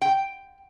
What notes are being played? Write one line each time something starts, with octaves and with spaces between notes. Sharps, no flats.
G5